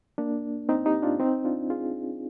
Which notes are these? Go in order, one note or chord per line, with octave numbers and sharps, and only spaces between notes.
A#3 D4
C4 D#4
D#4 G4
D4 F4
C4 D#4
D4 F4
F4 G#4